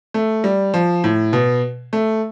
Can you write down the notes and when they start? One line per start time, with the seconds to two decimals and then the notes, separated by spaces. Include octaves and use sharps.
0.14 A3
0.44 G3
0.74 F3
1.04 A2
1.33 B2
1.93 A3